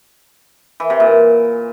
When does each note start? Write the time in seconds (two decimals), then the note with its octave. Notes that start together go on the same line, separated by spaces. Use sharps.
0.80 E3
0.90 C3
1.00 A#2